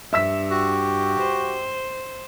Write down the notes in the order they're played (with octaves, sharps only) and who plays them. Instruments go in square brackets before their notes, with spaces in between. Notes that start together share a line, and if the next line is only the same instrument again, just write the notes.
[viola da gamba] G2 [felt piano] E5 E6 B6
[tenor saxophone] F#4 [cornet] G4
[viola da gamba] C5